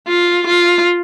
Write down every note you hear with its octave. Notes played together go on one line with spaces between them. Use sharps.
F4
F4